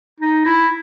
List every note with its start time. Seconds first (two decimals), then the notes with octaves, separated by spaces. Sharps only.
0.20 D#4
0.45 E4